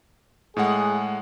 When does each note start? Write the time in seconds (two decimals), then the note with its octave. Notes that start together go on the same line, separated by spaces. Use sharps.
0.57 A2 G#3 G#4 F#5